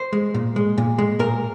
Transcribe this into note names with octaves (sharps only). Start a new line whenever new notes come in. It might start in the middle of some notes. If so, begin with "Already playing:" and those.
Already playing: C5
G#3
A#2
G#3
A#2
G#3
A#2 A#4